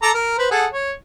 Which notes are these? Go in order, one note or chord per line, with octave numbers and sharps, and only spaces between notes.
A4 A#5 D6
A#4
B4 C5
G#4 A4 F#5
C#5